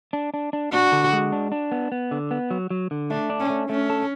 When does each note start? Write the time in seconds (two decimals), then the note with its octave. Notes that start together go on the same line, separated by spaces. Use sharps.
0.13 D4
0.34 D4
0.53 D4
0.73 D4 F#4
0.92 D3
1.13 G#3
1.32 D4
1.52 D4
1.72 B3
1.92 B3
2.11 D3
2.31 B3
2.51 F#3
2.70 F#3
2.91 D3
3.10 A3 D4
3.30 D4
3.40 C#4
3.50 A3
3.69 A3 C#4
3.90 A4